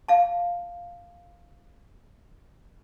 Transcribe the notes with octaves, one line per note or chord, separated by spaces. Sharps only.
F5 A5